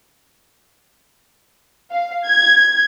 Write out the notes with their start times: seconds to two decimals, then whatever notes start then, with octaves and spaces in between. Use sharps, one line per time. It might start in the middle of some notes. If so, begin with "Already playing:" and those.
1.92 F5
2.26 G#6